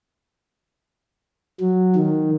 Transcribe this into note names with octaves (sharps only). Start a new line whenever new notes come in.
F#3
D#3